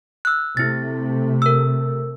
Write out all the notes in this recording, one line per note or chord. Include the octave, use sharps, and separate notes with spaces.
E6 F#6
C3 A3 E4 A6
A#4 E6